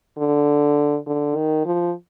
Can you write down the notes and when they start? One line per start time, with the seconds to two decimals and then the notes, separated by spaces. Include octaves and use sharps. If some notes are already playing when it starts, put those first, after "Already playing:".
0.18 D3
1.06 D3
1.36 D#3
1.66 F3